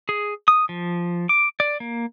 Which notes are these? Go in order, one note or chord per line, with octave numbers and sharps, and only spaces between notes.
G#4
D#6
F3
D6
D5
A#3